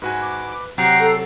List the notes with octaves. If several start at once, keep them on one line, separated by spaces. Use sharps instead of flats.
G#2 F#4 B4 G#5
D6
C3 F#3 F#4 F#5 G5 A#5 C7
A4